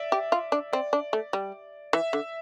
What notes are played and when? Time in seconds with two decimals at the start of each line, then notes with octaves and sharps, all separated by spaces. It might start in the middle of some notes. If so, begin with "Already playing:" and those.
Already playing: D5 E5
0.12 G4
0.32 F4
0.52 D4
0.73 C4 D5
0.93 D4
1.13 A3
1.33 G3
1.93 E3 E5
2.13 D3